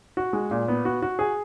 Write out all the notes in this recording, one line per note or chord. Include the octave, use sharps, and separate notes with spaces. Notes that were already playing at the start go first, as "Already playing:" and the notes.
F#4
G#3
A#2
B3
F#4
F#4
G#4